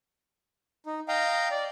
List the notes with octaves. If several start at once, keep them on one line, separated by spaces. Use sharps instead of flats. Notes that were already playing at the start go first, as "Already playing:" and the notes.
D#4
D#5 F5 G5 A#5
D5